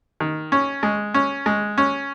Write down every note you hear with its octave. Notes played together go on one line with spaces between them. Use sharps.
D#3
C#4
G#3
C#4
G#3
C#4